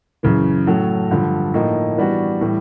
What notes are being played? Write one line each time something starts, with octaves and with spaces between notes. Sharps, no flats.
F#2 C#3 E3
A2 F#3 A3
G2 D3 F3
A2 F3 A#3 D#4
E3 G3 B3 D4 F#4
A2 E3 G3